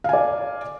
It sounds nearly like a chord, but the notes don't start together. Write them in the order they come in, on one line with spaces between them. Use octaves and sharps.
F5 G#5 D5